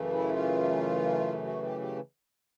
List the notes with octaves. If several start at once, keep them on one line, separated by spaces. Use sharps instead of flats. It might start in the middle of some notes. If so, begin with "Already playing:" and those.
Already playing: F#2 C#3 E3 A3
E4
F4
F#4
G4
G4